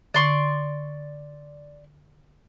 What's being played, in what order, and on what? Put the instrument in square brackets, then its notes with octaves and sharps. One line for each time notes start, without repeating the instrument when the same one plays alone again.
[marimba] D3 [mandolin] D5 C6 C#6